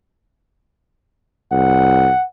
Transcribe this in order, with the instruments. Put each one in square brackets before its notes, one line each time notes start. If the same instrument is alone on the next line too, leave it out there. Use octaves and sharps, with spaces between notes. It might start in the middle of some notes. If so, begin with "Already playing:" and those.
[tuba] C2 [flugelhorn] F#5